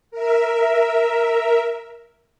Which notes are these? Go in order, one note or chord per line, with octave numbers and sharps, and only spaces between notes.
A#4 E5